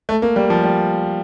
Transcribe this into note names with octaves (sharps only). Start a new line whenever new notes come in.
A3
A#3
G3
F3
G3